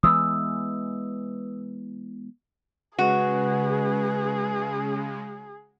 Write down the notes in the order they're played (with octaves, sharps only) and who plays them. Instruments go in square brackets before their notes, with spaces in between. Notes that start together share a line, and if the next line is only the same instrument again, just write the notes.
[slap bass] E3 G#3 B3 [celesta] D#6 E6
[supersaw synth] C#3 G#3 [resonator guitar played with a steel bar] F#4 [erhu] G#4 [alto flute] B4